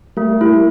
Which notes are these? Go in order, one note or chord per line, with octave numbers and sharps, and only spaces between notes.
G3 A3 A#3
E4